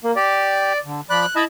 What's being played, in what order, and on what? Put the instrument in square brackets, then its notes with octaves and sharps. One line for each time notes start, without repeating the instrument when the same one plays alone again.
[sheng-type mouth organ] A#3
[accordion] G4 [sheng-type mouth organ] D5
[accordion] D3
[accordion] F3 D5 B5 [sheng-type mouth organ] F#6
[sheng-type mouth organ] E4 D#5 E5 [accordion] A5 B5